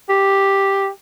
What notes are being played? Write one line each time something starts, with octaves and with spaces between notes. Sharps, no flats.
G4